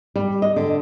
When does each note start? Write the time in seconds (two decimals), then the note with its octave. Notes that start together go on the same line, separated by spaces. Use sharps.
0.16 G3
0.42 D#5
0.56 D3